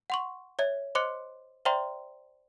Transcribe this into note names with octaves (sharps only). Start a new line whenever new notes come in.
F#5 C6 C#6
C#5 E5 G#6
C5 D#5 C6 D6 F#6 C#7
C5 D5 E5 G5 A#5 C6